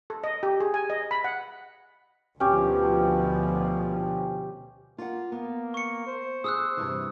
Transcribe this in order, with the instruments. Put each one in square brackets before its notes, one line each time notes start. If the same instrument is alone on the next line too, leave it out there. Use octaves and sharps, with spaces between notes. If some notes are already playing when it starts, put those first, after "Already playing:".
[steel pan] A4
D#5
G4
G#4
G#5
D#5
B5
F#5
[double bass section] D2 B2 F3 [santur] C#4 G4
[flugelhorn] A#3 [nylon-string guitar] F4 F#5
[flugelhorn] A#3 [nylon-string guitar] B3
[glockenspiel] C#6 C#7
[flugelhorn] C5
[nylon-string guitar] G#4 [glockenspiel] D#6 E6 F#6
[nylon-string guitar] G2 C3 E3